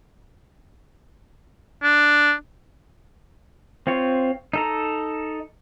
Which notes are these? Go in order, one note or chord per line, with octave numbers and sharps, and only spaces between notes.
D4
C4 F4 C#5
D#4 A4 A#5